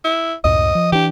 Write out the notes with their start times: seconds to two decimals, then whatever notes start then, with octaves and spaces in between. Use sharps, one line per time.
0.04 E4
0.44 C#2 F#2 A2 D#5
0.75 F3
0.92 E3 D4 G4